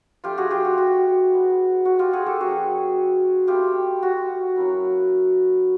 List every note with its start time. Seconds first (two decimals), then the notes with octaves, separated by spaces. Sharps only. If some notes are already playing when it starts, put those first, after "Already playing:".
0.24 F3 A3 D4 F4 G4
0.37 F#4 G#4
0.51 F4 G4
0.65 F#4
0.78 F#4
1.32 G#3 B3 E4
1.85 F#4
1.99 F4 G4
2.13 F#4 G#4
2.26 G4 A4
2.40 F3 A#3 C#4 F#4 G#4
3.47 A3 C4 E4 F4 G4
4.03 F#4
4.56 F#3 A#3 C#4 E4